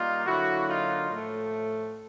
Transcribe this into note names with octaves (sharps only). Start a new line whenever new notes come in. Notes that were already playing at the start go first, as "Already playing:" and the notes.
Already playing: G3 A#3 D#4 F4
D3 F#3 A#3 E4 F#4
D#4 F4
A2 F3 A3